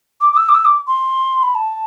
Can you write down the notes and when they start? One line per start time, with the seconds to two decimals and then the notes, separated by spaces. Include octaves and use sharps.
0.21 D6
0.33 D6
0.37 E6
0.49 D6
0.54 E6
0.65 D6
0.88 C6
1.43 B5
1.55 A5